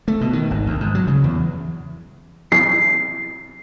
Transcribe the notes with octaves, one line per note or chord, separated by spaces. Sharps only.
A3
B2
D#3
G#1
D2
G#2
F#3
C#3
E2
C7